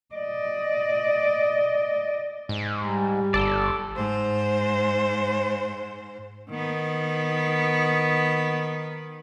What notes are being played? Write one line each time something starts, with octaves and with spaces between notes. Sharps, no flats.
D5 D#5
G#2
G3
G1 A4 D5
G#2 C5
D#3 B3